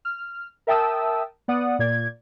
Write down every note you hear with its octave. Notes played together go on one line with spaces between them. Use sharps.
F6
A#4 E5 G5 A5 D#6 E6
B3 D5 F#5 D#6
A#2 D5 G#6